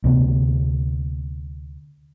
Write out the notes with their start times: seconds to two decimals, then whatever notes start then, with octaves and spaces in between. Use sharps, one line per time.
0.04 D2 C3 B3